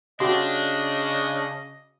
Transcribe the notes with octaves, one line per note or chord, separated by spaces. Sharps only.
C#3 D4 F#4 G4 D#5 C6